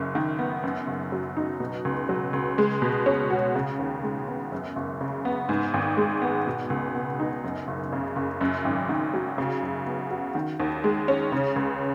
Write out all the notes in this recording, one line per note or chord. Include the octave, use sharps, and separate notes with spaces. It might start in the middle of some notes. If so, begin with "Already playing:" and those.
Already playing: F#1 F#2
D#3
B3
F#2
F#1
F#3
D#4
B2
C#2
F#3
C#2
G#3
B2
C#4
F#4
C#3
D#2
G#3
B3
F#2
F#1
C#3
B3
G#2
G#1
G#3
B3
B2
C#2
B3
D#4
F#2
F#1
C#3
F#1
F#2
G#1
D#3
F#3
C#3
F#2
B3
F#4
D#3
D#2
G#3
C#4
C#3
C#2